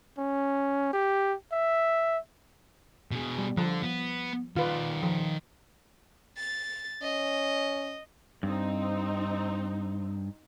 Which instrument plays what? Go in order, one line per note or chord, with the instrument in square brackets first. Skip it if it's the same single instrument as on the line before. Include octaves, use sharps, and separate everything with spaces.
[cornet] C#4
G4
E5
[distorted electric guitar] B2 G#4
[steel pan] G3
[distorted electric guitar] D3 [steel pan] F3
[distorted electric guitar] B3
[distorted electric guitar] D#3 D5 [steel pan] F4 B4
[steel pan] F3
[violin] A6
[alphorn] C#4 [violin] D#5
[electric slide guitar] G2 [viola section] C4 D#4